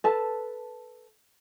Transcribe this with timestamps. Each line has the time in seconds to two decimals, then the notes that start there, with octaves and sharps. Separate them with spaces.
0.04 A4 B4 A5